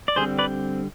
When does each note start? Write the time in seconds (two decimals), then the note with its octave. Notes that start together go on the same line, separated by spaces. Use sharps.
0.08 D5
0.16 D3 G3 C4 G#4 C5
0.39 B4 D5